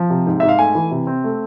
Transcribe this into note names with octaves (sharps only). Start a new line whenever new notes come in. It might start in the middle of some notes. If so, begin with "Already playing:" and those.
Already playing: F3
C3
G#2
G#2 E5
F5
A3 G#5
E3
C3
C4
A3